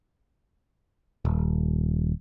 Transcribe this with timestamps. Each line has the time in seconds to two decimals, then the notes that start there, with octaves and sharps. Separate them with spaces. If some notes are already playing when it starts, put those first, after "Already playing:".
1.25 D#1